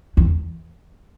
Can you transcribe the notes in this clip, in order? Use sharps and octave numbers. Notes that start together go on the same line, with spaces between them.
E2